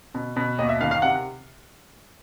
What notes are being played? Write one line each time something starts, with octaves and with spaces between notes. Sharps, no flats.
B2
B2
D#2 D#5
E5
D#3 F5
F5
C3 F#5